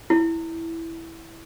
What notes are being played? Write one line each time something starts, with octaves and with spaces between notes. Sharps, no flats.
E4